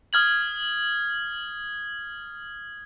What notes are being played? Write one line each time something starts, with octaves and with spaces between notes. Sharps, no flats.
D#6 F6 G#6 F#7